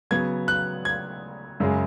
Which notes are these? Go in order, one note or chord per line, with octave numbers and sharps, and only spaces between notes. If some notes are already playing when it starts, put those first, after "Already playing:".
C#3 F#3 B3 G#6
F#6
G#6
F#2 C#3 G#3